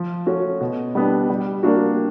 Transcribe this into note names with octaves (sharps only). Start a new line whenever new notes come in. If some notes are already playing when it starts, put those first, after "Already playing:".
Already playing: F3
A3 C#4 F#4
B2
G3 B3 D4
G3
A#3 D4 F#4